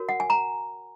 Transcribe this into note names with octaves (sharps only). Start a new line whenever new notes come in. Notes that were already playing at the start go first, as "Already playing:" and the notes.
Already playing: F#4 A#4 C#5
F#5
G#5
A#5